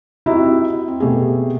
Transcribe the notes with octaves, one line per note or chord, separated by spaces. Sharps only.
C4 D#4 E4 F#4 G4
C4
B2 A3 G4 G#4